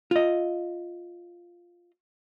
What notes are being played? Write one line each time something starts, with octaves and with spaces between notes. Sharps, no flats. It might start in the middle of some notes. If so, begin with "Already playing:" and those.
F4 D#5